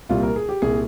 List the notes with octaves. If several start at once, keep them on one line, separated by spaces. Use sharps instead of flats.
C2 A#2 G3 F4
A#4
G#4
G4
C2 A#2 G3 G#4